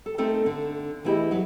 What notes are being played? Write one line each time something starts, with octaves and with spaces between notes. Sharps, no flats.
A4
A3 C4 D#4 A4 A#4
D3
E3 A3 E4 G4 G#4 D#5
F#3 B4